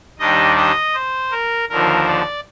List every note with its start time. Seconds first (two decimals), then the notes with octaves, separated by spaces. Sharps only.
0.19 D#2 D#3 G3 D4 D#5
0.56 D#5
0.94 C5
1.31 A#4
1.69 D#2 D3 F3 A#4
2.07 D5